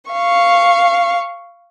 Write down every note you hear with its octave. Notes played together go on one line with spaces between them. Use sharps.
F5 C#6